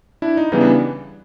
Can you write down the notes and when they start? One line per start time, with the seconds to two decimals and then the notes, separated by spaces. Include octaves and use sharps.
0.22 D4 E4
0.37 D#4
0.52 C#3 E3 G3 B3 D#4
0.61 D4